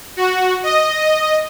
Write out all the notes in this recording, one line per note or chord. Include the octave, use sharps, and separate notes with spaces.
F#4
D#5